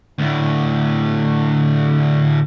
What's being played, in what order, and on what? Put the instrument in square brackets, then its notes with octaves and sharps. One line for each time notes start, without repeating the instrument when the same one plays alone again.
[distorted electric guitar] D2 A2